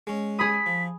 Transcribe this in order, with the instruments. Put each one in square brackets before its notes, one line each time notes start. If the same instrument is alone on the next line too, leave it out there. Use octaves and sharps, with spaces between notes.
[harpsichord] G#3 C#4
[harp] G#4 B5 D#6 [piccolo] B6
[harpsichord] F3